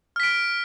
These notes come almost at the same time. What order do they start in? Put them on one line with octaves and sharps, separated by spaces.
F6 B6 D7